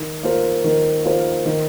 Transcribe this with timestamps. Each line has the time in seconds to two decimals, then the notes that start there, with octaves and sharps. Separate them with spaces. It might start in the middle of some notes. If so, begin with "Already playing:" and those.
Already playing: D#3
0.23 A#3 F4 C5
0.64 D#3
1.04 A#3 F4 C5
1.46 D#3